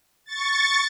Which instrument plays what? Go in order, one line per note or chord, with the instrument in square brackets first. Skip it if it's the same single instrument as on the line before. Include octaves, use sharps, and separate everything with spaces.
[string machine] C#6 A6